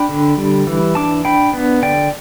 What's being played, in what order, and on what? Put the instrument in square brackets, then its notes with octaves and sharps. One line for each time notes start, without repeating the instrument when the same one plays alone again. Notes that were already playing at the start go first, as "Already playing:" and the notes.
Already playing: [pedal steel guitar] D4 G5 B5
D3
G3
E3
D4 A5 D6
D4 G5 B5
B3
D3 D5 G5